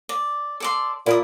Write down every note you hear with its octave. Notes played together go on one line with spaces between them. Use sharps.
D5
A4 D5 C6
A#2 E4 D5 D#6